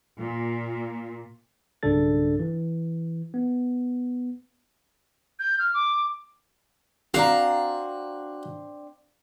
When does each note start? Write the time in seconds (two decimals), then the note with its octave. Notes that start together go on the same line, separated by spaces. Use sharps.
0.17 A#2
1.83 B1 G2 C#3 D4 A4 A6
2.40 E3
3.34 B3
5.39 G6
5.59 F6
5.74 D6
7.14 C4 D4 F#4 F5 A#5